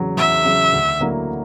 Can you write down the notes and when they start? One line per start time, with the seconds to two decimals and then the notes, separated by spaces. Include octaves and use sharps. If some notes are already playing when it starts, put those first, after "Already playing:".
Already playing: E2 C#3 F#3
0.17 E2 E5
0.45 C#3 F#3
0.73 D2
1.00 D3 F#3 A#3 E4